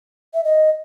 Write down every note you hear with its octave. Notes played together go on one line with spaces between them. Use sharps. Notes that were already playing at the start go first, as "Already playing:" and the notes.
E5
D#5